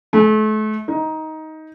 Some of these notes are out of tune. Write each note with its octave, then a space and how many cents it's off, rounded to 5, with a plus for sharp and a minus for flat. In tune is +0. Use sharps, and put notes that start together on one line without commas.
A3 -35
D#4 +15